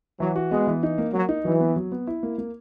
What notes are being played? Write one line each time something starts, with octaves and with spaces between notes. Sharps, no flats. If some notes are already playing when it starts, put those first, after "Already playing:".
E3 F#3
F#4
G#3 B3
E3
D#4
A#3
F#3 A#3
D#4
E3 F#3
B3
F#3
B3
E4
A#3
A#3